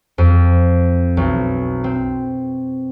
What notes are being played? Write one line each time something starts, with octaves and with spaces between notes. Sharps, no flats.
F2
B1
C4